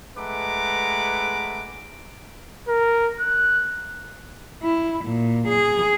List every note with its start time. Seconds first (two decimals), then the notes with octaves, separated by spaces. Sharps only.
0.18 G#3 A3 B4 F#5 A#5 D6
2.68 A#4
3.20 F#6
4.62 E4
5.04 A#2
5.48 G#4